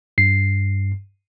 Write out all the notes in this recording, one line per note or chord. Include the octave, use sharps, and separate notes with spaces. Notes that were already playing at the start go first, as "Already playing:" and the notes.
G2 C7